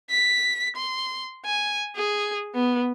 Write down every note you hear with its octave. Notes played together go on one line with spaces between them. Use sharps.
B6
C6
G#5
G#4
B3